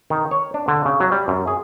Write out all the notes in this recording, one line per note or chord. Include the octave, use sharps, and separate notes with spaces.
D#3
C#5
D4
D3
C#3
F#3
G3
F#2
G#4